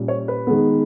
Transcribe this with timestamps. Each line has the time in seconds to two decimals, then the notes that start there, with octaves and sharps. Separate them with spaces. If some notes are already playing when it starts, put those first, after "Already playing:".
Already playing: A#2 G3 C#4
0.08 C#5
0.28 B4
0.47 D#3 G#3 B3